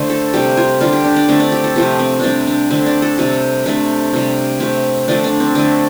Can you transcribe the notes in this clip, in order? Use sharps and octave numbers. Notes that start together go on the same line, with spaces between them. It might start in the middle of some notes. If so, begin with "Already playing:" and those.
Already playing: D3 A3 C5
A4
C3 G3 G4
F4
D3 G3 F4
G4
D4
D4
D3 A3 C4
D4
G4
A4
C3 F3 A3 G4
C4
C3 G3 C4 D4
D4
D3 A3 C4
D4
A4
C3 G3 A4
C3 A3 D4
C3 G3
C3 A3 C4
D3 F3 A3 D4
D4
C4
D3 A3 D4